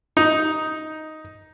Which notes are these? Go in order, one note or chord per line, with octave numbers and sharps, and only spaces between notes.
D#4